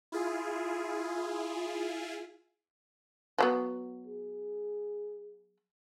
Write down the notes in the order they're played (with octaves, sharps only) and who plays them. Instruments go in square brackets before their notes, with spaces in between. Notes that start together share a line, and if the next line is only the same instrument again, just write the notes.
[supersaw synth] E4 F4 G#4
[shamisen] F3 F#3 B3
[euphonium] G#4